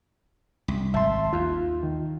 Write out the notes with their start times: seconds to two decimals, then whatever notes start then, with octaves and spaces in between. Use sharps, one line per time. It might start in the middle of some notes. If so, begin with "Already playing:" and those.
0.68 C2
0.94 G#1 E5 A5 C6
1.33 D#2 F4
1.83 D#3